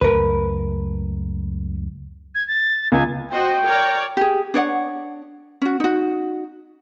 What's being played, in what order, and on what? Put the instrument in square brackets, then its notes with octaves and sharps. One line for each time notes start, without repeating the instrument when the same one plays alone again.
[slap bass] C#2 F#2 A3 [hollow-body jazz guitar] A#4 B4
[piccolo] G#6
A6
[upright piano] C#2 [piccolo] G#5
[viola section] F#4 C5 D#5 [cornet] G5
[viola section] A#4 C#5 D5
[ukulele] G4 G#4
D4 C#5 D5 F#5
C#4 F#4
D#4 F#4